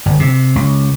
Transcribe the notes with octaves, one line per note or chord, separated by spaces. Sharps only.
G1
C3
C#2